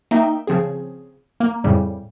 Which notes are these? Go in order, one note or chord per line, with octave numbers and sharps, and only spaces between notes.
A#3 D#4 E5 G5
C#3 F3 C4 G#4
A#3
F2 A2 C#3 G3